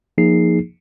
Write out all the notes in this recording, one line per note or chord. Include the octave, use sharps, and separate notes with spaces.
F3 A#3 D#4 G#4 C7